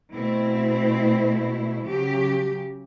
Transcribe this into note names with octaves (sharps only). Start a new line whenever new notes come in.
B2 A3 C4 E4
C#3 F#3 G4